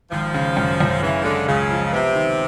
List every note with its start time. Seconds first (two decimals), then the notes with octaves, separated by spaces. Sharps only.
0.11 G#1 F3
0.34 C#3
0.57 F#2
0.80 F#2
1.02 C#3 E3
1.20 D#3
1.25 D3 G#3
1.48 C#2 C#3
1.70 F3
1.93 C3 B3
2.16 D#3